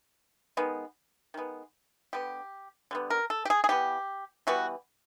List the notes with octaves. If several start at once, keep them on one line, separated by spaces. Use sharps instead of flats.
D#3 G#3 B3
D#3 G#3 B3
D3 G3 B3 G4
D3 G3 B3
A#4
A4
G4
G#4
G#4
E3 G3 B3 G4
E3 G3 B3 F#4